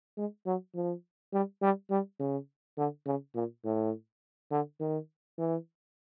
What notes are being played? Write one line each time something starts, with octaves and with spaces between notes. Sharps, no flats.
G#3
F#3
F3
G3
G3
G3
C#3
D3
C#3
A#2
A2
D3
D#3
E3